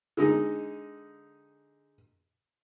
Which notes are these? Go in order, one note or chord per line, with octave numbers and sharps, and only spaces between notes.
D3 G#3 D#4